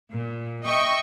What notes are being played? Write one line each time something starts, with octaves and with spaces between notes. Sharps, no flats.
A#2
D#5 E5 G5 C#6